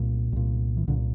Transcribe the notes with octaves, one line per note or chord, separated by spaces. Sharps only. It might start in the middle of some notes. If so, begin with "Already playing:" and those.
Already playing: C2 A#2
C2 A#2
E3
C2 A#2 D3